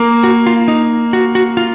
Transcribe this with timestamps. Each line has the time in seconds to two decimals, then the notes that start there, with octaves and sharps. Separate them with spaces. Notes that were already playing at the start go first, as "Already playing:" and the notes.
Already playing: A#3
0.24 F#4
0.47 F4
0.68 D#4
1.13 F#4
1.35 F#4
1.57 F4